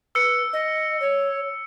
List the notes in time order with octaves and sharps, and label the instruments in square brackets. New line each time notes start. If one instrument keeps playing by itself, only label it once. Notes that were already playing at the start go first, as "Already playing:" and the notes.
[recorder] B4 [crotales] E6 C#7
[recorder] D#5
C#5